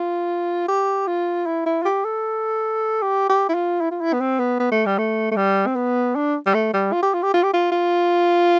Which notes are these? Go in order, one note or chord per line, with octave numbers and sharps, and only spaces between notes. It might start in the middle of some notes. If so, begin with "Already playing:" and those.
Already playing: F4
G4
F4
E4
E4
F4
G4
A4
G4
G4
E4
F4
E4
F4
E4
B3
C4
B3
B3
A3
G3
A3
A3
G3
C4
B3
D4
G3
A3
G3
F4
G4
F4
G4
F4
G4
F4
F4